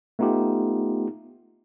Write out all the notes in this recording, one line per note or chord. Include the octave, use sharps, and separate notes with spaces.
A3 B3 D#4 F4 G4